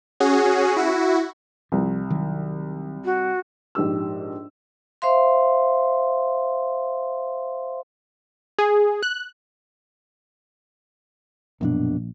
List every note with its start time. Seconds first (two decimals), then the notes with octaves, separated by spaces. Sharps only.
0.20 C#4 F#4 G#4
0.76 E4 F#4
1.72 C2 F3
2.10 D#3 F#3
3.05 F#4
3.75 A#1 G#2 G4 E6
5.02 C5 E5 F5 C6
8.58 G#4
9.03 F#6
11.61 A#1 F#2 B2 D4